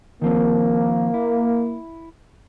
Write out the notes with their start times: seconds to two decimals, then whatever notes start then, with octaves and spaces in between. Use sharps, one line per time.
0.22 D#3 F3 A#3 C4
1.14 E4